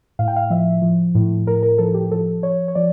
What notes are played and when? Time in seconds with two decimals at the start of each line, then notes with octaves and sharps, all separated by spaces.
0.19 A2 F5
0.28 G5
0.36 F5
0.50 F3 E5
0.82 F3
1.15 A2
1.47 A2 A#4
1.63 A#4
1.78 F3 A4
1.94 G4
2.11 F3 A4
2.43 F3 C#5
2.68 C#5
2.75 F3 D5